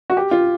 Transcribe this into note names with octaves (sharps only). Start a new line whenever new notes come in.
F#4
G4
F4